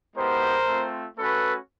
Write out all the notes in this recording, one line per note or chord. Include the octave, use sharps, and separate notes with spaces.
G#3 B3 E4 G4 A#4 C5
A3 C4 F4
A3 C#4 F#4 A4 B4